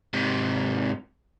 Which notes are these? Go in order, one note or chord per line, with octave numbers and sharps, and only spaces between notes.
G#2 C3